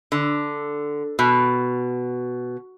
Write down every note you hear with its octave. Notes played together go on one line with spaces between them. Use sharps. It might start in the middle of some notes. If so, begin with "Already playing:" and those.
D3
B2